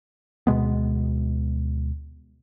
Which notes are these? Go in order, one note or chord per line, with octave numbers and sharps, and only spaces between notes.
D2 B2 G#3 B3